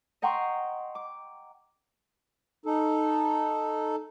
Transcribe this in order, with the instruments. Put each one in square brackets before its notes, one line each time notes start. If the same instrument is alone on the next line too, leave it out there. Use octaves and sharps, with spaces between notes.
[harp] D#5 F#5 G5 A#5 C6 C#6
D6
[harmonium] D#4 A4